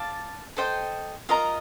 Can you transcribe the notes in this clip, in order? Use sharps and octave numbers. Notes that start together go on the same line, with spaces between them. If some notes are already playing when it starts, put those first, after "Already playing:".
Already playing: D5 F5 A5
A4 C5 D#5 G5
F4 A#4 D#5 A#5